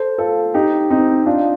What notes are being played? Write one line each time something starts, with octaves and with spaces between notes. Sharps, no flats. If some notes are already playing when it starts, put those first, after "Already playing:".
Already playing: A4 C5
F4 A4
D#4 G4
C4 D#4
D4 F4